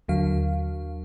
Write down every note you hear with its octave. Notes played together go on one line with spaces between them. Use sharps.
D#2 D3 F#3 F5